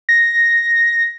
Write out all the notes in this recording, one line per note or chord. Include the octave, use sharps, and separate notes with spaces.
A#6